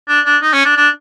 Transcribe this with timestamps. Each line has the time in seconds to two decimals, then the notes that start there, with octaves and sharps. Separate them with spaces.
0.08 D4
0.25 D4
0.42 D#4
0.53 C#4
0.65 D4
0.77 D4